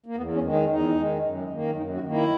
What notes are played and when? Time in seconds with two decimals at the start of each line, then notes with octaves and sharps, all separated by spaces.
0.06 A#3
0.16 E2 B3
0.34 C#4
0.43 D#3 G#3
0.52 D#4
0.69 E2 D#4
0.96 D#3 G#3
1.22 F#2
1.50 D#3 A#3
1.76 F#2 D#4
1.94 F#4
2.03 D#3 A#3
2.12 E4